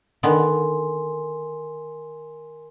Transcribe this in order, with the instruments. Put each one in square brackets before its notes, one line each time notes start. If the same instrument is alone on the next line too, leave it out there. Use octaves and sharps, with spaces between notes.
[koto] D3 D#3 B3 [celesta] A#4 G#5 C6